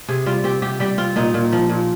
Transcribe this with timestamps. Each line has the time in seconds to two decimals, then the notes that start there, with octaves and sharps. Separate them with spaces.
0.09 C3 G#4
0.26 G3 F4
0.44 C4 G4
0.62 C3 G4
0.80 G3 G4
0.98 C4 F4
1.16 A#2 D#4
1.34 A#2
1.53 F3
1.69 A#2